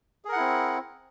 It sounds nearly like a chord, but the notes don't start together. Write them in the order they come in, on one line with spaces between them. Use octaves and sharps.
G#4 A#4 F#5 E4 C4